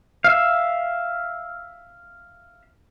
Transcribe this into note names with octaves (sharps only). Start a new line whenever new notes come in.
E5 F5